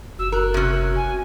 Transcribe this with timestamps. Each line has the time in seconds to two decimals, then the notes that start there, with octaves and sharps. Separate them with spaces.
0.18 F#1 F#4 E6
0.32 F#4 A#4 F#6
0.54 C3 C#4
0.95 G#5